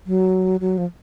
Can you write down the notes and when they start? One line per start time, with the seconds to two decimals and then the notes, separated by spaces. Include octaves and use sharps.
0.07 F#3
0.60 F#3
0.78 F3